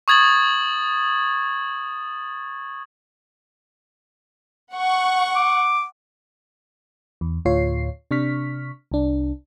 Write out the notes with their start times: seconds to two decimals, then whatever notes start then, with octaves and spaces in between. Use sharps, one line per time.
0.08 C#6 D#6 G#6 A6 F#7
4.73 F#5 C#6
5.35 D6
7.21 E2
7.45 D2 A2 F4 C#5 C7
8.11 C3 D4 C#6 F6 B6
8.92 C2 D4